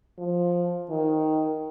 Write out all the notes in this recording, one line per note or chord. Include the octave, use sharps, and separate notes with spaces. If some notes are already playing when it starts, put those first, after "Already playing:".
F3
D#3